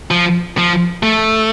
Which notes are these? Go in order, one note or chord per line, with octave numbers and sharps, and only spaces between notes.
F3
F3
A3